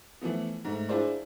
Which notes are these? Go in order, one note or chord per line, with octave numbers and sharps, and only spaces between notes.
E3 F3 A3 B3
G#2 A3
D4 E4 F4 G#4 C5 D5